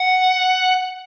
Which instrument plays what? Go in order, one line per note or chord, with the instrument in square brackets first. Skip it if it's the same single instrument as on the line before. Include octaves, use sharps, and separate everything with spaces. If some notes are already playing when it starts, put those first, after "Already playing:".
Already playing: [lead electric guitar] F#5